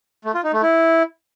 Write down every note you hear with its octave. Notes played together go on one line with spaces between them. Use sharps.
A3
F4
D#4
A3
E4